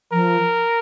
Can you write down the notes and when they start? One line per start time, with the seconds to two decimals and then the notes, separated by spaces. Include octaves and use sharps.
0.12 F3 A#4